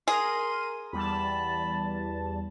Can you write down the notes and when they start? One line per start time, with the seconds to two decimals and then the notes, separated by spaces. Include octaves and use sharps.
0.08 G#4 A#4 C6 D#7
0.93 E2 G3 A5 B5